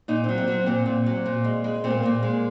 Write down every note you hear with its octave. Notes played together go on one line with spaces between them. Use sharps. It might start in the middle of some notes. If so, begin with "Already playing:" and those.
A#2 D#4
F#3 C4
C4
F#3 C4
A#2 C4
A#2
F#3
A#2
G#3
G#3
A#2 C4
A#3
A#2 A#3
G#3